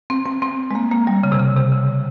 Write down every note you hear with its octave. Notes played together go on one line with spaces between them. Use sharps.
C4
C4
C4
G#3
A#3
A#3
G3
C#3
C3
C#3
C3
C#3